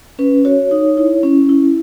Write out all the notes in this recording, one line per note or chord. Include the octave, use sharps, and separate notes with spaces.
C#4 B4
F#4 C#5
D#4
E4
C#4
E4